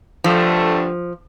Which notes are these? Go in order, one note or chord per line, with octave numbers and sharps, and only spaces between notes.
G2 D3 F3 A3